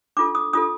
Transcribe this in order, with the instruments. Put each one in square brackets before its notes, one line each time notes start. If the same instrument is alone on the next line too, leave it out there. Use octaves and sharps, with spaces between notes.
[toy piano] D4 F4 A4 D6
D#6
D4 F4 A4 D#6